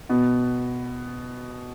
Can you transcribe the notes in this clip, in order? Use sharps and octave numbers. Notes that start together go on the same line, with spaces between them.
B2 B3